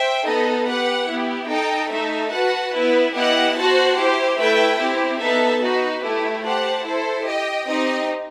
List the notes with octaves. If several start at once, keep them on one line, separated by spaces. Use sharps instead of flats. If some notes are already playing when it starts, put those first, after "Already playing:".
Already playing: C5 E5 G5
B3 D#4 A4 D#5
G4 B4 F#5
B3 E4 G4
D#4 A4 D#5 G5
A3 D#4 A4 E5
F#4 B4 F#5 A5
B3 E4 B4
B3 E4 G4 D#5 F#5
F#4 C5 F#5 A5
E4 G4 C5
A3 E4 B4 E5 G5
C4 E4 G4
B3 D#4 A4 E5 A5
D#4 F#4 B4
A3 E4 G4
G4 C5 F#5 A5
E4 A4 C5
G4 D#5 G5
C4 D#4 G4 D#5